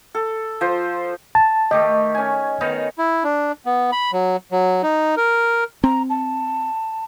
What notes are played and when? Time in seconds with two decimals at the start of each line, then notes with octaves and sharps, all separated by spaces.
0.15 A4
0.61 F3 C5
1.35 A5
1.71 D#3 A3 G4 D#5
2.15 C#4 G#5
2.61 D#3 B3 D#4
2.98 E4
3.24 D4
3.66 B3
3.92 B5
4.13 F#3
4.52 F#3
4.83 D#4
5.17 A#4
5.84 C4 A#5
6.10 A5